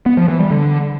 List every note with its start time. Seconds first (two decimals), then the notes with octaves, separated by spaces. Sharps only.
0.06 B3
0.17 F3
0.28 E3
0.39 G3
0.50 D3